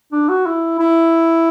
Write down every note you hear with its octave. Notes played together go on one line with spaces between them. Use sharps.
D4
F#4
E4
E4